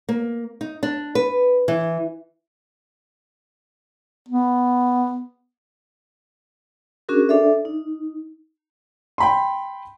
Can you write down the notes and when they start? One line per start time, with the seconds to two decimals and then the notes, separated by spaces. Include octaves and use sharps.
0.09 A#3
0.61 D#4
0.83 D4
1.15 B4
1.68 E3
4.29 B3
7.09 C#4 D4 F#4 G#4 A#4
7.29 D4 A4 D5 E5
7.65 D#4
9.18 G5 B5 C6